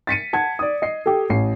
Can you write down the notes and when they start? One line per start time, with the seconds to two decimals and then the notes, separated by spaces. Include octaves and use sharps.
0.07 A6 B6 C#7 D#7
0.33 F#5 A5 G#6
0.59 D5 D#6
0.82 D#5 C7
1.06 G4 A4
1.30 A1 C7